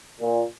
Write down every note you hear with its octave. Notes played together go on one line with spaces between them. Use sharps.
A#2